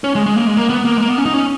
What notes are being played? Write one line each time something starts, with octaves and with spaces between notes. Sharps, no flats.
C#4
G#3
G#3
A#3
G#3
A#3
B3
A#3
G#3
A#3
B3
C#4
D#4
C#4